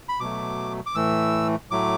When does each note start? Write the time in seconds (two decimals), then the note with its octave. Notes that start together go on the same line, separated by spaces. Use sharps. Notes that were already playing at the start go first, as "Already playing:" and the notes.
0.09 B5
0.20 B2 F#3 A3 D6
0.86 D6
0.95 A2 E3 A3 E6
1.71 A2 F#3 A3 D6